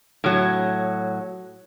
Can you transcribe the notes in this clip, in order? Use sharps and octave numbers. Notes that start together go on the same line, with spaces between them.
A2 F#3